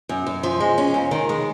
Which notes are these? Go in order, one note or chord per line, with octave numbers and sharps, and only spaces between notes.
F#2
F#2
F3
G#3
C#4
F2
D#3
G#3